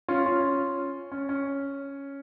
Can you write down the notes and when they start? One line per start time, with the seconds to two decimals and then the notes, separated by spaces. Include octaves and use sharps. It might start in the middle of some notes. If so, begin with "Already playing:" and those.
0.08 C#4 F4
0.26 C#4 F4
1.12 C#4
1.29 C#4